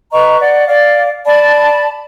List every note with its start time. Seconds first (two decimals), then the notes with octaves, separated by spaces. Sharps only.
0.13 B4 D#5 A#5 C#6
0.41 D5 F#5
0.68 D5 F5
1.25 D5 A5 B5